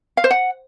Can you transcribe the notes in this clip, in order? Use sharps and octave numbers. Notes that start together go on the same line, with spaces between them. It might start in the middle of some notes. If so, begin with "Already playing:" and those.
F5
C5
F#5